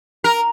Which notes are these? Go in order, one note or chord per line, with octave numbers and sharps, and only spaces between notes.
A#4